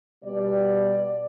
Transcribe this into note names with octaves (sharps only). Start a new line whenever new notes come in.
B2 G3 D5